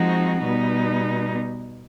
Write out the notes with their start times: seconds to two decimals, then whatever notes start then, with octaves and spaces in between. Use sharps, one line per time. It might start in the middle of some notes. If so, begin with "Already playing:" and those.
Already playing: F3 G#3 C4 D#4 F#4
0.42 B2 G3 B3 D#4